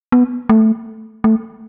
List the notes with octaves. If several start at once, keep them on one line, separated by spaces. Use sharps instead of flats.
B3
A3
A3